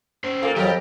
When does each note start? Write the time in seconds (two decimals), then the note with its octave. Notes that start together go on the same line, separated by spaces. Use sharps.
0.24 C#4 C5
0.42 A#2 A#3 A4 A#4
0.56 F2 F#3 G4 A#4